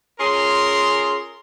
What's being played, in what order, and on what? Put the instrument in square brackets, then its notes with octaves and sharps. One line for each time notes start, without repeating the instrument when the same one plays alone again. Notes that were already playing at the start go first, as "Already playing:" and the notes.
[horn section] C#4 F4 G#4 A#4 C6